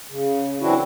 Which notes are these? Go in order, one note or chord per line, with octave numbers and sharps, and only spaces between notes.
C#3
E3 F#3 C4 D4 E4 F#4